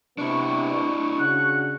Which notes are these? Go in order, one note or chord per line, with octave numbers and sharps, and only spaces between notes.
C3 B3 D4 E4 C#6
C#3 D4 F#4 F#6